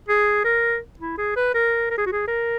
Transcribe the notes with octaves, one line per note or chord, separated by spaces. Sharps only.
G#4
A#4
E4
G#4
B4
A#4
A#4
G#4
F#4
G#4
A#4